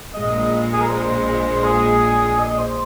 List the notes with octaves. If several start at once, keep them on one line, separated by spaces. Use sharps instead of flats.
A#1 A#2 G#3 D#5
G#4
A#4
C5
G#4
D#5
C5